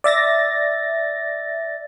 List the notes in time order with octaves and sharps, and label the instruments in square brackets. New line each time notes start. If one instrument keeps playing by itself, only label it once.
[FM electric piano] D5 E5 A6 A#6